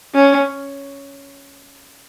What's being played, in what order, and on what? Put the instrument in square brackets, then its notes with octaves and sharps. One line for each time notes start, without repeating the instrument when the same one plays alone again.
[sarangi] C#4